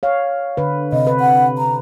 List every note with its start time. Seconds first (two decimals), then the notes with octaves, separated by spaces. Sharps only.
0.03 C#5 F5
0.57 D3 B4
0.92 C3 C4 D#5
1.07 B4
1.20 F#5
1.58 A#5